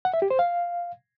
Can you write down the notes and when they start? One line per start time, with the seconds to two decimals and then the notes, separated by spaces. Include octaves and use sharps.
0.05 F#5
0.14 E5
0.22 G4
0.30 C5
0.39 F5